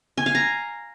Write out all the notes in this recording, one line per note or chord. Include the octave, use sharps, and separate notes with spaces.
G#5
F5
A#5